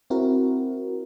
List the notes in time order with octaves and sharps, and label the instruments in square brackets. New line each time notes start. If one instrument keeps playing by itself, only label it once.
[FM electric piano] C4 E4 F#4 A#4